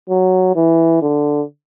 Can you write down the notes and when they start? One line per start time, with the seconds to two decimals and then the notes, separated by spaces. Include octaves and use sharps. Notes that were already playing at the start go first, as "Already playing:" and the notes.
0.10 F#3
0.56 E3
1.02 D3